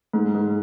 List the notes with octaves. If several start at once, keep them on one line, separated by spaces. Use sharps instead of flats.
G#2
G#2